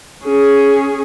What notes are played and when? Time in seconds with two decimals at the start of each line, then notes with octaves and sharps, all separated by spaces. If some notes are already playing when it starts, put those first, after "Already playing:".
0.25 C#4 G#4